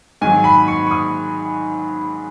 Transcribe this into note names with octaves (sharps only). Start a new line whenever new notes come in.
G#2 D#3 F#3 G#5
B5
C#6
C#6
D#6